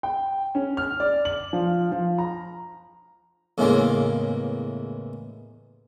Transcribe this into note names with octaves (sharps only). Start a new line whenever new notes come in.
G5
C#4
F6
D5
F#7
F3
F3
A#5
E2 A2 C#3 E3 G#3 A#3